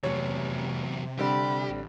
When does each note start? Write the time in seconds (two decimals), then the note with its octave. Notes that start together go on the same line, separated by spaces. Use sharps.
0.03 F1 E2 C3 F#3 C#5
1.19 D3 G3 C4 G4 B5
1.70 A1